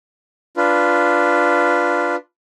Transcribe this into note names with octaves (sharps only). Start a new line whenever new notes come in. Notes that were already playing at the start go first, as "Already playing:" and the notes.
D4 F4 B4